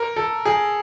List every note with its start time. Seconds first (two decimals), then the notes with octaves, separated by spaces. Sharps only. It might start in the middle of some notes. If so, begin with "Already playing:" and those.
Already playing: A#4
0.16 A4
0.45 G#4